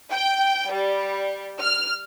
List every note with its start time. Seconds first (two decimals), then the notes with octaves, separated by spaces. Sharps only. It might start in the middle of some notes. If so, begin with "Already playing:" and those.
0.12 G5
0.72 G3
1.61 F6